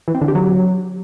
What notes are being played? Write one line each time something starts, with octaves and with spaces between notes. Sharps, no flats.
E3
C4
D3
G4
F#3